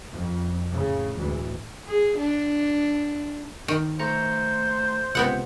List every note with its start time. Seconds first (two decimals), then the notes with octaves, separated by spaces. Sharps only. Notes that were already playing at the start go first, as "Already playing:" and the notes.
0.12 F2
0.71 A2 C#3
1.15 D2 A2 E3 G#3
1.86 G#4
2.17 D4
3.68 D#3
3.99 A3 C5 A#5 C#7
5.15 C#2 C3 B3 F#5